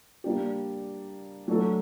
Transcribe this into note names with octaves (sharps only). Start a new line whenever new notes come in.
G3 A#3 D4 G4
F#3 A3 D4 F#4 A4